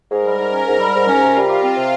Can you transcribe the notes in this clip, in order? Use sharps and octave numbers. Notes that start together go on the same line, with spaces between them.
G#2 A#4
G3
G#2
C#4
G#2
G3
G#2
C#4
C3 F4
G3
G4
C4
C3